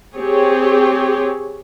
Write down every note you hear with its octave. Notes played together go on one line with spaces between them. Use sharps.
C4 G4 G#4 C#5